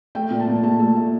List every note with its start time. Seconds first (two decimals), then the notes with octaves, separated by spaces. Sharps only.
0.15 A3 G5
0.31 A#2
0.40 A5
0.47 A#2
0.63 A3 A5
0.80 A3
0.96 A3